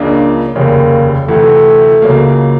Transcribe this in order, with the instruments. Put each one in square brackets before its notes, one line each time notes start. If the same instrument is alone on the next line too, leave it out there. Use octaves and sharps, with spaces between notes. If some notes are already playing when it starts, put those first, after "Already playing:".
Already playing: [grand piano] C#2 C#3 F3 A#3 [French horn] D4
[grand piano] F1 D#2 C#3 [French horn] A#3
[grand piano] D2 C3 E3 [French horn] A3
[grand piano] C#2 C#3 F#3 A#3